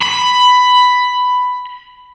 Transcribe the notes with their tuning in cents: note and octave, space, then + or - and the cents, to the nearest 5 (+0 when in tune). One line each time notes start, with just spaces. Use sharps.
B5 +10